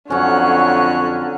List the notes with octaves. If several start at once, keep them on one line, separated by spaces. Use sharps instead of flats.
F2 D3 F#3 C#4 C#5 F#6